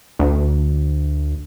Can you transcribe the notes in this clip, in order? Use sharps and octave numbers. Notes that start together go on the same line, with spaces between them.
D2